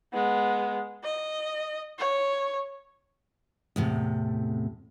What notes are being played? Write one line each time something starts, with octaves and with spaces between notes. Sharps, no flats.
G#3 B3
D#5
C#5
E2 A2 C3